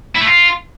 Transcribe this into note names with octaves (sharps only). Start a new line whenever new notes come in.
E4
A3
F4